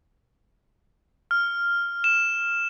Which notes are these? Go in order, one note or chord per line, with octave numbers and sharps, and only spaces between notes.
F6
E7